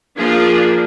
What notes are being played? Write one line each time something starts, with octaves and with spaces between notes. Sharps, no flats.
F3 A#3 D4 F4 G#4